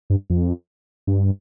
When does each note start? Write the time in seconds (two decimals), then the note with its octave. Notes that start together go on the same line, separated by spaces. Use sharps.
0.10 G2
0.30 F2
1.07 G2